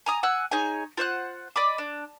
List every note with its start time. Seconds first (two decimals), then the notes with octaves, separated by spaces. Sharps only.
0.06 G#5 A#5 D#6
0.23 F#5 G#5 E6 F#6
0.51 D#4 G#4 C#5 G#5
0.97 F4 C5 F#5 F#6
1.56 D5 D#5 B5 D6
1.78 D4